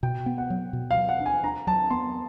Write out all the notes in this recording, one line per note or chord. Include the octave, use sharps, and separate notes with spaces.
B2 G5
B3
F#5
F#3
B2
F5
F#3
F#5
D4
G#5
D4 A#5
F#3 A5
B3 C6